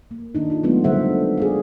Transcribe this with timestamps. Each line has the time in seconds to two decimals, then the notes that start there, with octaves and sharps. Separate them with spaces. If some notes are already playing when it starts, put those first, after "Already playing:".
0.11 A#3
0.35 D#3 D4 D#4
0.50 D#4 F4
0.63 F#3 G#3 A3 B3 D4 F4
0.84 D3 G3 A4 C5 E5 F#5
1.38 G#4 D5 F5